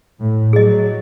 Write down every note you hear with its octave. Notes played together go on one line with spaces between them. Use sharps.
A2
F#3 G#4 D#5